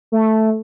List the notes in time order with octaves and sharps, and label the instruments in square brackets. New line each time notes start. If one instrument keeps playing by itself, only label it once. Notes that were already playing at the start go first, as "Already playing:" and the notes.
[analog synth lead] A3